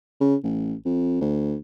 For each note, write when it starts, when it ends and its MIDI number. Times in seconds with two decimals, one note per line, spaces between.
0.20 0.35 49
0.44 0.74 33
0.85 1.19 41
1.21 1.56 38